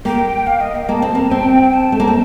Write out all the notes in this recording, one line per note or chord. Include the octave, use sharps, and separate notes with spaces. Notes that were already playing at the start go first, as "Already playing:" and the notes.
A#3 G5
F5
D#5
G5
A#3 A5
C4
A#3
C4 G5
A5
A3
A#3
C4